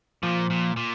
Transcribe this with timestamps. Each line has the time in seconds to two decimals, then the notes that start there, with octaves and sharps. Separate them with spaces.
0.23 A#2 F3
0.50 A#2
0.76 A#2